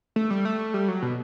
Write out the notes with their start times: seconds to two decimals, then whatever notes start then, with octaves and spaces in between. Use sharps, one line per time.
0.16 A3
0.30 G3
0.45 A3
0.74 G3
0.88 F#3
1.02 B2